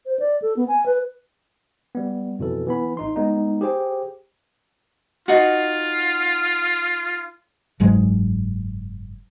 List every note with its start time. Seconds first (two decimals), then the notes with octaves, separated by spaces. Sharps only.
0.06 C5
0.19 D5
0.42 A4
0.57 B3
0.68 G#5
0.86 B4
1.95 G3 B3
2.39 F2 B2 E3 A4
2.67 E3 B3 B5
2.97 A1 D#4 C6
3.16 G#3 B3 D#4
3.61 G4 G#4 C5 G5
5.28 D#4 F4 F#4
7.80 F#1 G#2 F#3 G#3